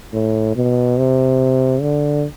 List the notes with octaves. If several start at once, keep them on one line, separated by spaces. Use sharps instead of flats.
A2
B2
C3
D3